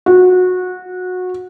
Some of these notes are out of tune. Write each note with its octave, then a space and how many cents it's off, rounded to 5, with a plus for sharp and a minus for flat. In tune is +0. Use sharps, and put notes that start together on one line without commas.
F#4 -20